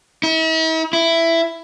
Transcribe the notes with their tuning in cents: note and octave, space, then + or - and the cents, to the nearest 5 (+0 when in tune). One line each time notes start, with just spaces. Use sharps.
E4 -45
E4 +10